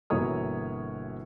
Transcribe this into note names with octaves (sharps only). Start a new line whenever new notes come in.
G1 B2 E3 A#3 C#5 D#6